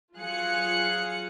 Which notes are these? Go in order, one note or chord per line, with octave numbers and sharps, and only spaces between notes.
F#3 F4 G#4 F5 F#6 C#7